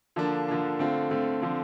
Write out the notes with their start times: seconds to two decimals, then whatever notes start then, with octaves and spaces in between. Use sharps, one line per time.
0.16 D3 F3 A#3 D4
0.48 D3 F3 A#3 D4
0.79 D3 A3 C4 F4
1.11 D3 A3 C4 F4
1.42 D3 F3 C4